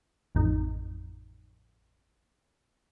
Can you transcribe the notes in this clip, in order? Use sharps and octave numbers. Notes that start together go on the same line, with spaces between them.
A1 F2 D#4